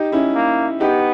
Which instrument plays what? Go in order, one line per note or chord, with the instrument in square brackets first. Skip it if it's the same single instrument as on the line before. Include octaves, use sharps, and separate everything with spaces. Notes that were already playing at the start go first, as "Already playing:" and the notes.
Already playing: [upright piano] D#4 G4
C#4 E4
[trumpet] A#3
[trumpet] B3 [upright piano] D#4 G4